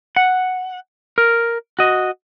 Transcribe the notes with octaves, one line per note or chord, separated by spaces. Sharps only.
F#5
A#4
F#4 D#5